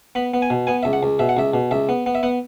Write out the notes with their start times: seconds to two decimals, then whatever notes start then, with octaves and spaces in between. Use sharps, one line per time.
0.15 B3 B5
0.34 B3
0.42 G#5
0.50 B2
0.67 B3 G#5
0.83 C#2 E5
0.93 F#5
1.03 C#2
1.19 B2 E5
1.29 F#5
1.37 C#2 E5
1.54 B2
1.71 C#2 E5
1.89 B3
2.06 B3
2.15 E5
2.23 B3 F#5